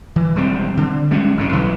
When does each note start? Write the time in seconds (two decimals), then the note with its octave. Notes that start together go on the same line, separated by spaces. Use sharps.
0.16 E3
0.35 E1 G3 C4
0.77 D3
1.11 G3 G#3 C#4
1.37 G1 A2 C#3
1.53 B1 E3